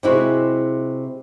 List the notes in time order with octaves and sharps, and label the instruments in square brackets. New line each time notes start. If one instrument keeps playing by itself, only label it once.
[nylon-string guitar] C3 G#3 E4 F#4